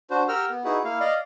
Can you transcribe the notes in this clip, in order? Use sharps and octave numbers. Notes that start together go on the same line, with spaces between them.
D4 F#4 C5
G4 A#4 F#5 G5 E6 F6
B3
D#4 E4 F#4 G#4 B4
A#3 E4 F5
D5 D#5 F5